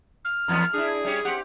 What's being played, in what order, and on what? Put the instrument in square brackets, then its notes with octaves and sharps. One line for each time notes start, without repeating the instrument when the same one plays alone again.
[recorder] F6
[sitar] E2 A2 B3
[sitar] D4 E4 [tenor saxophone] G#4
[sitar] G3 C#4 G4
[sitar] C4 G4 [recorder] F#5